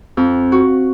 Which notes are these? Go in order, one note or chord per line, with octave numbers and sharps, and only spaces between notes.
F2
F#4